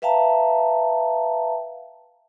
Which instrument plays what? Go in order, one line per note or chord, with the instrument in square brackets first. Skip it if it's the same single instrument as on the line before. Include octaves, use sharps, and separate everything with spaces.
[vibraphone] B4 E5 F5 G5 A5 A#5